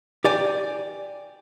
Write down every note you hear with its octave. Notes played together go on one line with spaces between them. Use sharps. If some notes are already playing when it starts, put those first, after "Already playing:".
G4 D5 G#5